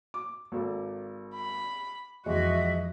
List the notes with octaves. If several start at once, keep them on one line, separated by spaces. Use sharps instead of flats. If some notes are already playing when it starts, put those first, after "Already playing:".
D6
G#1 A#3 A4
B5
F2 E3 G#3 F#4 D#5 E5